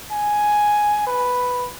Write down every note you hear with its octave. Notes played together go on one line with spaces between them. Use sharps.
G#5
B4